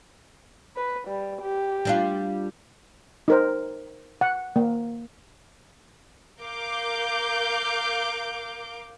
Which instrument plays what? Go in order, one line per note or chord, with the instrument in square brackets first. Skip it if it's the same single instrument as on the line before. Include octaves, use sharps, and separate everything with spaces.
[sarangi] B4
G3
G4
[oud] G3 D4 F4
[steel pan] D#4 A#4 C5
F#5
A#3
[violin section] A#4 F5 D6 G6